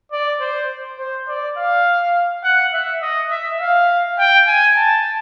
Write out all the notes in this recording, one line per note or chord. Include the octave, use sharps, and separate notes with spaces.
D5
C5
C5
D5
F5
F#5
E5
D#5
E5
F5
G5
G#5
A5